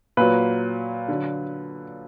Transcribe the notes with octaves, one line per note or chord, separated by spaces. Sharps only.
A#2 F#3 B4
D3 F#3